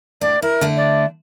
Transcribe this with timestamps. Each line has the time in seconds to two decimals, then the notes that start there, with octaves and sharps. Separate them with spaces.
0.21 A2 D4 D5
0.42 E4 A#4
0.61 D3 A3 D4
0.76 D5